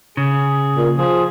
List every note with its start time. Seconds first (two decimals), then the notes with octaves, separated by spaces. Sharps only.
0.17 C#3 G#4
0.76 A#2
0.97 F3 G#4